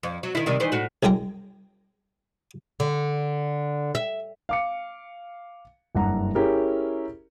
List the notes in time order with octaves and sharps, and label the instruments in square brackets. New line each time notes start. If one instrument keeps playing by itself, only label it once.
[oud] F2
F#3
D#3 E4
C3 D#3 G3
D#3 E3 C5
A2 F#4
[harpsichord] C2 F#2 G#3 G5 A#5
[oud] D3
E5
[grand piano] F5 D6 C#7
F#1 G2 F#5 A#5
C#4 E4 G4 G#4 A#4